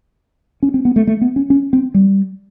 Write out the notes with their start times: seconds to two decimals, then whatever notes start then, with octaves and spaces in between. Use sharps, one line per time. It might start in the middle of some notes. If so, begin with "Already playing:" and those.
0.63 C#4
0.74 C4
0.85 B3
0.96 A3
1.07 A3
1.21 B3
1.36 C#4
1.50 C#4
1.73 C4
1.94 G3